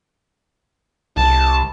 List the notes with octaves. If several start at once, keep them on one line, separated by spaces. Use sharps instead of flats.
C2 A5